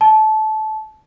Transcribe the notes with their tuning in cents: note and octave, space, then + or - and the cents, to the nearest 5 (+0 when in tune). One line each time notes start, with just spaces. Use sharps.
A5 -20